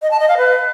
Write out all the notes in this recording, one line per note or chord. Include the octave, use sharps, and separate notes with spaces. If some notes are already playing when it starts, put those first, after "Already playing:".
D#5
A5
D#5
F5
B4